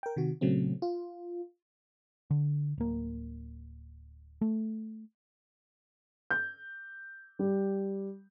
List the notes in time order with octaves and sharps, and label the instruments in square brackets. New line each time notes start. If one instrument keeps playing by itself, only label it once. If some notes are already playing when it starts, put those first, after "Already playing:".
[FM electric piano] A#4 G5
C3 D#3 F#4
A#2 C#3 F#3 A3 C4
F4
[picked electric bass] D3
D1 A#3
A3
[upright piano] G6
G3